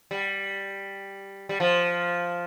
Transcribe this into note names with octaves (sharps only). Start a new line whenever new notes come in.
G3
G3
F3